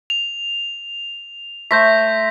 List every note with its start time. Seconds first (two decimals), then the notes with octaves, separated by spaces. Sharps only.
0.10 F7
1.71 A3 C5 G6 A#6 B6